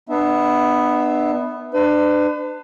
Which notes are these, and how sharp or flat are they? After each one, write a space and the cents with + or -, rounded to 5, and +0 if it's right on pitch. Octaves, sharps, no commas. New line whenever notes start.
B3 +0 D4 +35 E5 -15
D4 +30 B4 +45